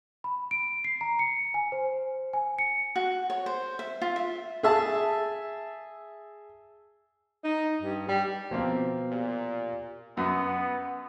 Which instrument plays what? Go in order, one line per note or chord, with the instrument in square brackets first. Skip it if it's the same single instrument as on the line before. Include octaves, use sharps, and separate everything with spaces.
[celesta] B5
D7
C7
A#5
C#7
G#5
C5
G#5
C#7
[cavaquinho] F#4
C#5
C5
E5
F4
E5
[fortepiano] G#4 E5 A5
[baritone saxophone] D#4
G2
G3
[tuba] B2 [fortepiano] F3 A#3 C4
[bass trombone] A#2 [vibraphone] G4
[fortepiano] F#2 [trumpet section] B3